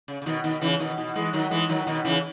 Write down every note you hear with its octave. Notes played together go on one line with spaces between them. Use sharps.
C#3
C#3
B2 D#3
B2 D#3
C#3 E3
B2 D#3
B2
E3 G#3
D#3 F#3
E3 G#3
D#3 F#3
B2 D#3
C#3 E3